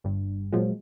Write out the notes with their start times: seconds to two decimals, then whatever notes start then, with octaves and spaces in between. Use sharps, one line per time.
0.04 G1 G2
0.52 A#2 F3 F#3 G#3